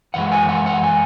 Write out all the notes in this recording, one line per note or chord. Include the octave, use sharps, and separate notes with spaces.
F#2 E3 G#3 F#5
G#5
F#5
F#5
G#5